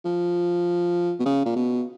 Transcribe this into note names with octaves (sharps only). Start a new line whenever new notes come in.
F3
B2
C#3
A#2
B2